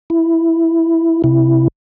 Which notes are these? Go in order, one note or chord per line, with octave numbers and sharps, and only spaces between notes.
E4
C3 E4